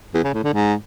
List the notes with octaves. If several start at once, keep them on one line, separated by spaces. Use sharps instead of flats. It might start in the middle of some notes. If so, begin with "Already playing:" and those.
E2
C#3
A2
D3
G#2